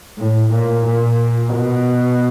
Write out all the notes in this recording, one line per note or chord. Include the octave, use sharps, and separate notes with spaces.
A2
A#2
A#2
B2